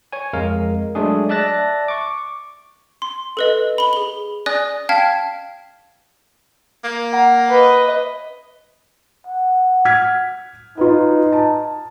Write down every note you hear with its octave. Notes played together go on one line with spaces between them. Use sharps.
C#5 G#5
F2 G#3 A#4 F5
F#3 G#3 A3 D4 G#4
D5 E5 A5 F#6 A6 A#6
C#6 D6
C6
A4 B4 D#5
B5 G7
G#4 G7
D5 G#5 D#6 F#6 A#6
F5 G5 A5 F6 G#6 B6
A#3
F#5 A#5
B4 D#5
F#5
F6 G#6 B6
D#4 F4 B4
A5